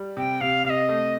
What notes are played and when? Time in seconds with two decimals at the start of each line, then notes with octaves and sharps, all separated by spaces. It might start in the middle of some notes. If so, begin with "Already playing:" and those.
Already playing: G3
0.17 C3 G5
0.40 C3 F5
0.65 C3 F5
0.69 D#5
0.89 A3